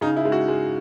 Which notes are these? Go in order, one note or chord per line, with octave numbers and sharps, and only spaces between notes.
C#3 D#4
E4
G#3
F#4
G#3